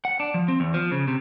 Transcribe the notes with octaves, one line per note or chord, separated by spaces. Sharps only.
F#5
D4
F3
C4
E2
F3
C#3
C3